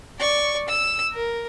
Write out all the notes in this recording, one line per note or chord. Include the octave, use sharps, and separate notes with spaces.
D5 C#6
E6
A#4